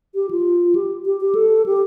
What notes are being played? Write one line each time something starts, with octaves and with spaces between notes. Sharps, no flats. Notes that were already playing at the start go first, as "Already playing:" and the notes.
G4
F4
G4
G4
G4
A4
G4